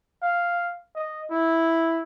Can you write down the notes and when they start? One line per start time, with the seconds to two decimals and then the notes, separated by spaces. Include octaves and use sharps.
0.22 F5
0.95 D#5
1.31 E4